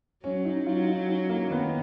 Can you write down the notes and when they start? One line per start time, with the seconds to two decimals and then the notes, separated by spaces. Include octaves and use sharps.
0.23 F#3 C#4
0.45 D#4
0.66 F#3 F4
0.87 D#4
1.09 C#4
1.29 A#3
1.51 D#3 B3